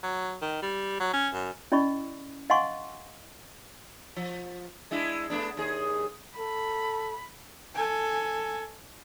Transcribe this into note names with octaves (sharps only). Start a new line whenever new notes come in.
F#3
D#3
G3
F#3
C#4
F#2
C#4 E4 D5 D#5 B5 C#6
D#5 F5 F#5 G#5 C6 C#6
F3
G#3 D4 E4
A3 B3 D4
D#2 G#4
A4 B5
A4 G#5